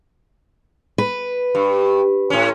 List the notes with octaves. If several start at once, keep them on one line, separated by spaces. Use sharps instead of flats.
B4
G2
A2 C#4